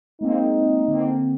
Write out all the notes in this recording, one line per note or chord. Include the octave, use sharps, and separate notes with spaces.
G#3 A#3 C4 D#4
D3 A#3 C4